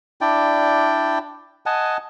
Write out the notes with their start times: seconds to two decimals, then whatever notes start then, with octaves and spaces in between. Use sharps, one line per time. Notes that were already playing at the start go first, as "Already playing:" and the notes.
0.21 D4 E4 D5 G5
1.66 D#5 F#5 G#5 A5